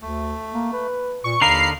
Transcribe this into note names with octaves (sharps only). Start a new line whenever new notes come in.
D2 A3
A#3
B4
A#2 C#6
D#2 D3 D#4 A#4 F5 A#5 B5 C7